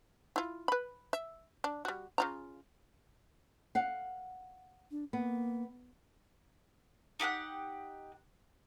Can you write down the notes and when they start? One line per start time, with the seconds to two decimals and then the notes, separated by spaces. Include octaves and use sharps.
0.36 E4 F4
0.68 B4 B5
1.13 E5
1.64 D4
1.85 G3 F#4
2.18 C#3 F4 A#5
3.75 F5 F#5
4.91 D4
5.13 A#3 B3
7.20 D#4 G4 F#5 F#6